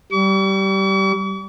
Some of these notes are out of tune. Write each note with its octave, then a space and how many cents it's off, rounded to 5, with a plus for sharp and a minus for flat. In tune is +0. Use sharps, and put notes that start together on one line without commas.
G3 -20 C#6 +45